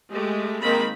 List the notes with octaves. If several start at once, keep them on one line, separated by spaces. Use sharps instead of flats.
G#3 A3 G4
D#3 G#3 A#3 C4 B5